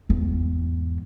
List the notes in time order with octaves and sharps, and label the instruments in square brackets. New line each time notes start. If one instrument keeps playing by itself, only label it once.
[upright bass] E2 G#2